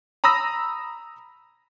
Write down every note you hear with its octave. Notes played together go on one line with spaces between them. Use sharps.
A#5 B5 D#6 E6 A#6